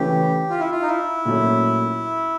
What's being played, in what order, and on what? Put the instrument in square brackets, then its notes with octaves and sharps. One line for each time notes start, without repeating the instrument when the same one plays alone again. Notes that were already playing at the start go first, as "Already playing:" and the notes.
Already playing: [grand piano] C#3 E3 A3 C#4 [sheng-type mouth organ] G4
[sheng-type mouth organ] F4
E4
F4
D#4
E4
[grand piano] A#2 F#3 A3 C#4